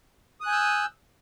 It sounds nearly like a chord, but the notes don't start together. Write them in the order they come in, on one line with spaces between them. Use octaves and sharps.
D#6 F#6 G#5 G6 E6